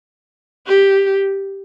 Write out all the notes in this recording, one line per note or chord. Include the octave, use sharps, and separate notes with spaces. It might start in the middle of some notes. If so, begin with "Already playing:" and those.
G4